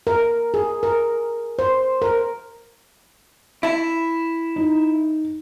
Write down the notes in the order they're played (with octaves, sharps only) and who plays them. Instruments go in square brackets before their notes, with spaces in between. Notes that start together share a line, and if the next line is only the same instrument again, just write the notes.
[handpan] A#4
G#4
A#4
C5
A#4
[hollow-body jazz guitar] E4 A5
[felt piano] D#4